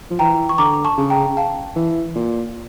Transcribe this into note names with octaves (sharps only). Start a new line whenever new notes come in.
F3
E3 G5 A#5
C#6
D3 A#5 D6
A5 C#6
C#3
G5 A#5
F5 A5
E3
A#2